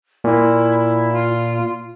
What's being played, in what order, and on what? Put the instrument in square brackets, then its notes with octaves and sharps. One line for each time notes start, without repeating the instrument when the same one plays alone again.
[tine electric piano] A#2 [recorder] E4
[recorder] F4